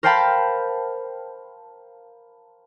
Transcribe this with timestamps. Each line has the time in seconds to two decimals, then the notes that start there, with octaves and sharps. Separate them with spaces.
0.03 A#4 C5 F5 G5 A5 B5